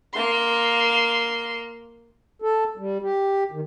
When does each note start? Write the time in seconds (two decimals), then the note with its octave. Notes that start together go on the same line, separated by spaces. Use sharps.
0.14 A#3 C6
2.42 A4
2.78 G3
3.02 G4
3.52 D#3